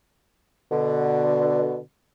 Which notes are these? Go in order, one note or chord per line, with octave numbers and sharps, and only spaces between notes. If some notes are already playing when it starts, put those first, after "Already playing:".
B2 D3